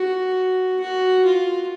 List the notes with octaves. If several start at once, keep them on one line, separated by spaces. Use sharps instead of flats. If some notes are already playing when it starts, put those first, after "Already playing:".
Already playing: F#4
F#4
F4